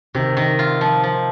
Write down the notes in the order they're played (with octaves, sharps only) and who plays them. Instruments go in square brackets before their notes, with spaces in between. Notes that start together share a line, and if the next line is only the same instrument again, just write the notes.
[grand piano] C3 [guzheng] D#3
[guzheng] D#3
F4
F3
F3